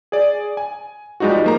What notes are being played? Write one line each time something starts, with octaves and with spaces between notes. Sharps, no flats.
G#4 D5
G#5
F3 G3 G#3 D#4 F4 F#4
F3 A#3 A#5